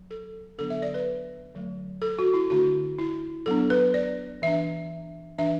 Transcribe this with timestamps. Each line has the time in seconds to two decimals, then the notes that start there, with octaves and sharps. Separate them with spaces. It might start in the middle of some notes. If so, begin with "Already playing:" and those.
Already playing: F#3
0.11 A4
0.58 D3 F#3 B3 D4 A4
0.70 E5
0.82 D5
0.94 B4
1.55 D3 F#3 A3
2.02 A4
2.19 F#4
2.34 E4
2.50 D3 A3 D4 F#4
2.99 E4
3.46 F#3 B3 D4 A4
3.70 B4
3.94 D5
4.42 E3 D4 E5
5.38 E3 D4 E5